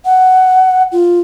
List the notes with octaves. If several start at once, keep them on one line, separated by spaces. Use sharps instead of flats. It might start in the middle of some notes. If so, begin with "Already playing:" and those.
F#5
F4